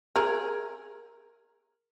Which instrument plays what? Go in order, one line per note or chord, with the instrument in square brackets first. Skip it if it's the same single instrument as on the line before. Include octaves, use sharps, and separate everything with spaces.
[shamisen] G#4 A#4